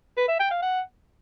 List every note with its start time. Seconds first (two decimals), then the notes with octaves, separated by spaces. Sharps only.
0.17 B4
0.28 E5
0.40 G5
0.51 F5
0.62 F#5